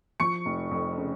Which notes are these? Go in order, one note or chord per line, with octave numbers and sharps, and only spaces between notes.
F3 C#6 C#7
F1
F2
C#3